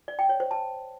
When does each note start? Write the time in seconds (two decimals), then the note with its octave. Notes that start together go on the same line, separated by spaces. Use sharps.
0.08 D5
0.19 G5
0.29 C#5
0.40 C5
0.51 A5